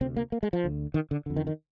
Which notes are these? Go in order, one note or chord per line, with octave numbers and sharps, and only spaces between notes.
D2 C3 C4
A#3
A#3
G#3
F3
D2 D3
D#3
D3
F2 D3
D#3
D#3